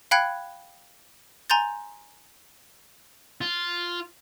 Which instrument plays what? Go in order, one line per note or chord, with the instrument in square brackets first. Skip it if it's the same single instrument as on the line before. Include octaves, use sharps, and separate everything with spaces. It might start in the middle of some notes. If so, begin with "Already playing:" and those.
[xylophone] F5 G5 B5 F#6 G#6 C#7
G#5 A#5 C6 G6 A6
[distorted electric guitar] F4